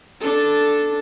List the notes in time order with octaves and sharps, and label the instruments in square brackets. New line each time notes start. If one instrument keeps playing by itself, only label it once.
[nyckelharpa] D4 A4